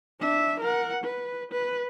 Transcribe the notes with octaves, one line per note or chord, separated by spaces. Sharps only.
D4 E5
A#4 F#5
B4
B4